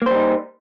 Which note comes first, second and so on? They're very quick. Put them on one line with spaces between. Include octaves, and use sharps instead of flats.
A#3 C5 G3 D#4